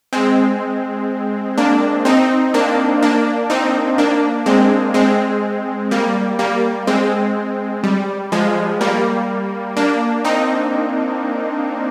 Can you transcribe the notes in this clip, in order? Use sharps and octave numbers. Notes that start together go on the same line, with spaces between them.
G#3 C4
A#3 D4
C4 D#4
A#3 D4
A#3 D4
C4 D#4
A#3 D4
G#3 C4
G#3 C4
G3 A#3
G3 A#3
G#3 C4
G3
F3 G#3
G3 A#3
A#3 D4
C4 D#4